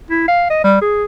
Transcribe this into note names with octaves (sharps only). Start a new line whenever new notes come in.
E4
F5
D#5
G3
G#4